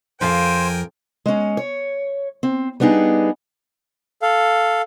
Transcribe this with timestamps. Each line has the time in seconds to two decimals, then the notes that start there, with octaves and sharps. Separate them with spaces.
0.21 F2 F3 A#4 C5 F5 G5 G#5
1.26 G#3 C#4
1.57 C#5
2.43 C4
2.80 G3 B3 D4 D#4 G#4
4.22 A4 F5